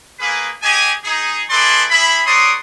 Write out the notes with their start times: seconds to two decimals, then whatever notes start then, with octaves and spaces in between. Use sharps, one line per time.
0.20 A#3 G#4 B4
0.62 G4 G#4 D#5 G#5
1.04 D#4 G#4
1.50 E4 G#4 A4 B4 D5 C6
1.90 E4 G#4 E5 B5
2.26 F#4 A#4 C#5 D5 C6 D#6